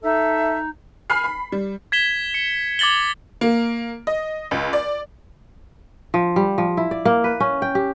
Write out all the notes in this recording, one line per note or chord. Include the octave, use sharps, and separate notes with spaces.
D#4 A4 E5
G#5 B5 F6 C7
B5
G3
G#6 B6 E7 G7
C#7
D6 G#6 A6 F#7 G7
A#3
D#5
C#2
D5
F3
G3
F3
E4
D5
A#3
B4
C#4
G5
G4